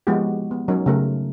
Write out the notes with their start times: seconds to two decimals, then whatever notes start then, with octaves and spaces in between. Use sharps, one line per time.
0.07 F3 G#3 B3 E4 F#4 G4
0.51 B3
0.68 F#3 C#4 D#4 A#4
0.86 C#3 A3 A#4